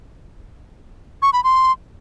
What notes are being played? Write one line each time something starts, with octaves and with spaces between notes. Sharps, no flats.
C#6
B5
C6